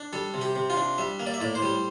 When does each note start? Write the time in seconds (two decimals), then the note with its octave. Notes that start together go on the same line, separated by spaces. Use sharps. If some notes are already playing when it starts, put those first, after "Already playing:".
Already playing: D4
0.13 G3 A4
0.34 C3
0.41 G4
0.56 C3
0.70 F4
0.77 D4
0.98 G3 E5
1.20 A#3
1.27 D5
1.34 E5
1.41 A2 D5
1.55 C5
1.62 G3